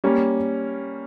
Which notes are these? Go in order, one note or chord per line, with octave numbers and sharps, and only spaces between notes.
G3 A#3 C#4